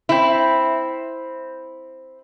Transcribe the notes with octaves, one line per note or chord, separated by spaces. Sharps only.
C4 E4